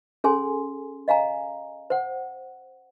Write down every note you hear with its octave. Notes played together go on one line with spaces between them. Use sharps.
C#4 G#4 A4 G#5 C6
D#5 F5 G#5 A#5
C5 F#5